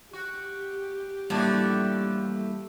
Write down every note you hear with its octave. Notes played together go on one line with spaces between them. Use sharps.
F#4 G4
A2 E3 F3 G3 A3 A#3 D4 F#4